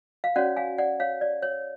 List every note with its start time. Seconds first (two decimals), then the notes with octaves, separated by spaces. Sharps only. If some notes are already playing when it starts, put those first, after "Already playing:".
0.24 F5
0.36 C#4 F#4 C#5 D5 F#5
0.57 F5 G#5
0.78 D5 F#5
1.00 C#5 F5
1.21 D5
1.42 C#5